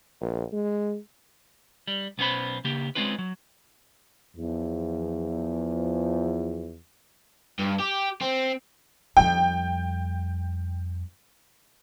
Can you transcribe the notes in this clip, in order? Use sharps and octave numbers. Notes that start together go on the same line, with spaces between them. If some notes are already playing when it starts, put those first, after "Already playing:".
A#1
G#3
G3
B1 B3 C#4 C5 B5
C#3 A#3 G4
G#3 C4 C#4 F4 B4
F#3
E2 F3
G2
G4
C4
F2 G3 G5